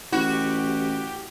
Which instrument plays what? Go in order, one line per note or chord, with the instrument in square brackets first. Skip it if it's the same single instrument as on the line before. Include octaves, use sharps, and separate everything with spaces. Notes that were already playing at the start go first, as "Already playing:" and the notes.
[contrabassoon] A1 [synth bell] E4 [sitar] F#4 [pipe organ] G4